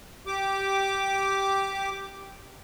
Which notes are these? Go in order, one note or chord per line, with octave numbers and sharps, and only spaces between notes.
G4 D6